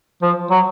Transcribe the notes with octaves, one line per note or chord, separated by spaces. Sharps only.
F3
F#3